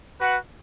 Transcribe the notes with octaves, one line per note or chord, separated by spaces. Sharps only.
F#4 B4 F#5